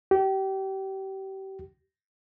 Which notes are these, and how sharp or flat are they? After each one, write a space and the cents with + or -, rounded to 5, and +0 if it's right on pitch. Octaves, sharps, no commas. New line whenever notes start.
G4 -30